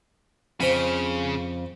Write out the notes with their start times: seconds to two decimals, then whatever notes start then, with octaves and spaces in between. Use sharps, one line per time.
0.61 F2 C#3 C5 B5